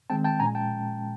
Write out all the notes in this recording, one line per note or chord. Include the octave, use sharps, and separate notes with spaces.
D#3 G#3 C4 G5 A5
G5 A5
A#2 F3 G#3 C#4 G#5 A#5
G5 A5